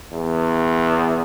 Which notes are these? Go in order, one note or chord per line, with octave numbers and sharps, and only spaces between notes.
E2